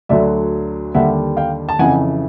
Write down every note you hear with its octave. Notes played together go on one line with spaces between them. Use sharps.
D2 D3 F#3 D5 E5
D#2 D3 G3 E5 F#5
F5 G5
A5
F2 C#3 E3 F#5 G#5